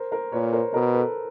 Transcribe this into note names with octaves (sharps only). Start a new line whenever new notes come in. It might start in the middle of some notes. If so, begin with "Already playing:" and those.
Already playing: A#4 C5
A#4 C5
A#2 B4 C#5
A#4 C5
B2 A#4 C5
A4 B4